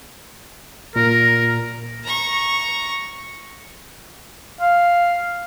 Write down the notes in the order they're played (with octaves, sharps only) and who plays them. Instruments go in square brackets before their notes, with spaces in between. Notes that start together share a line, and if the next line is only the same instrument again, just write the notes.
[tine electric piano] A#2 [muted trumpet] A#4
[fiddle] A#5 C#6
[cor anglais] F5